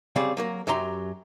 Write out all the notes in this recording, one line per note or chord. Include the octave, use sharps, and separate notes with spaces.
C#3 G3 C4 G#4 D5
F#3 A#3 A#4
F#2 F#3 G4 A#5 C6